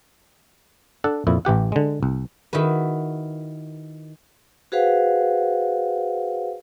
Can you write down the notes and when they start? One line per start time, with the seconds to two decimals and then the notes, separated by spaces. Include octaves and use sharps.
1.04 D4 A4 F#5
1.27 F2 A#2 E4
1.45 A1 E3 G4 F#5
1.72 D3 G#3
2.03 C2
2.53 D#3 E4 F#4 B4
4.72 F#4 G#4 B4 C5 F5 F#5